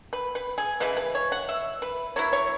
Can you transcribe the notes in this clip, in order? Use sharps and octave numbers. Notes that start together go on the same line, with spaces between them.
B4
B4
G#4
C#3 E3 G#3 B4
B4
C#5
F#5
E5
B4
F#3 B3 E4 C#5
C#5